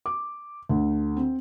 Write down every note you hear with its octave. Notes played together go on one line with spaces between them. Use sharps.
D6
D2
C4